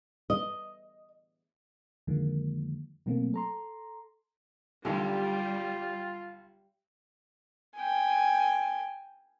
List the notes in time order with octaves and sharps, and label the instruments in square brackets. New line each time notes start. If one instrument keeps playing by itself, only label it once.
[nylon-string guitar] D#5
[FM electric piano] F2 D3 D#3 F3 G#3 A#3
B2 F#3 A3 A#3 C4
A4 A#5 C6
[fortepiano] B1 D3 [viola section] G3 [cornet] F4 [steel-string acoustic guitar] G4
[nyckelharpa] G5 G#5